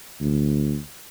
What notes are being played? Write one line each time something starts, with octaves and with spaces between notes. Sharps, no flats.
D2